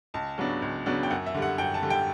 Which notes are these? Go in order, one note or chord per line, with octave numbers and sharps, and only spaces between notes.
C#2 A5
C#3 F#3 B3 D4
C#2
C#3 F#3 B3 D4
G5
F#2 F#5
E5
D3 G3
F#5
F#2 G5
A5
D3 G3
G5